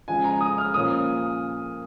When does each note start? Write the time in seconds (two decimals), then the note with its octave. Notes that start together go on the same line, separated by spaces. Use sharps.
0.08 C#3 F3 G#3 F4 G#5
0.24 A#5
0.41 D#6
0.58 F6
0.74 A#2 F3 A#3 C#4 D#6